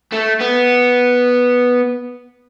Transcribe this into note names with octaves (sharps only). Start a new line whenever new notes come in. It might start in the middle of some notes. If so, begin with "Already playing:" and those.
A3
B3